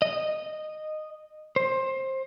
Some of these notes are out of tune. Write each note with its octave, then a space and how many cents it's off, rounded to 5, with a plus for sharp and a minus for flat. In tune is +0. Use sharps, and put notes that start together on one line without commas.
D#5 -10
C5 +20